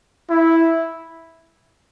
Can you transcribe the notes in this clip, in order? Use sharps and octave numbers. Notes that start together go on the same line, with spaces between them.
E4